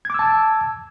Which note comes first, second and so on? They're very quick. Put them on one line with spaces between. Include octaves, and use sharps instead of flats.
G#6 D6 E6 A5